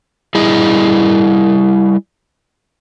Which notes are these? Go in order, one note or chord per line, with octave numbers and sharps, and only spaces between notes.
G3 E4 G#4 D#5